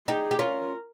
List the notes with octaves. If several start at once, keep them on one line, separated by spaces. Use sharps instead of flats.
D#4 G4 G#4
G4
C#4 F4 A#4